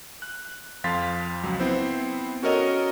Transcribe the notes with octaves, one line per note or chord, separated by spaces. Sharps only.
F#6
F2 F3 F5 C6 A6 B6
C#2 F#3
B3 C4 E4 C5
C#4 F#4 A4 A#4 C#5 D#5